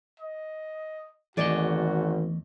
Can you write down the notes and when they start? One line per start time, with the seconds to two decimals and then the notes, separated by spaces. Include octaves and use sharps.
0.20 D#5
1.37 G#1 E2 A3 F#4 G#4 D5 D#5